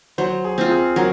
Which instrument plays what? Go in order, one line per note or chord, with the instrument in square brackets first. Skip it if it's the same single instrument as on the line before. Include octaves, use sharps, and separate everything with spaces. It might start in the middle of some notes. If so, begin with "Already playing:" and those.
[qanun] F#3 [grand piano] C5
[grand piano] G#4
[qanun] C4 F4
[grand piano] G#4
[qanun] F#3 [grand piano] A#4